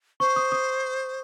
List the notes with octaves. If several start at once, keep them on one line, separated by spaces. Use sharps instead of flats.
C5 C#6
D#6
D#6